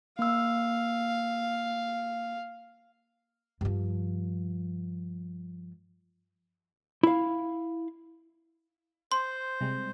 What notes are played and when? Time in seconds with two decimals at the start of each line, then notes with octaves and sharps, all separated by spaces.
0.19 A#3 F5 E6
3.61 G2 F3
7.03 E4 F5
9.12 C5 C6
9.61 C3 G3 G#3